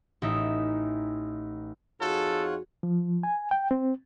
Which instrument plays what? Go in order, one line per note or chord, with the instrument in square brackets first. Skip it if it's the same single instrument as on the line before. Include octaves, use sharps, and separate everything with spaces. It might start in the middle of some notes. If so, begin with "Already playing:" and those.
[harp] A1 D#4 E5
[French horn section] F2 D#4 G#4 [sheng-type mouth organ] F4 C#5 F#5 [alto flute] F#4 [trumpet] A4
[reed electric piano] F3
G#5
G5
C4